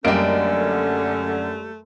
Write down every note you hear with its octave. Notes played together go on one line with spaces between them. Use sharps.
F#2 D3 G3 A3 A#3 C#4 D#5 D7